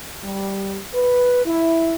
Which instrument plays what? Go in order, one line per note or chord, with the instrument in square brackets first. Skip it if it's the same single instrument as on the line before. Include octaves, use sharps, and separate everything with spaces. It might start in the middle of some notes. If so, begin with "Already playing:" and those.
[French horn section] G3
B4
E4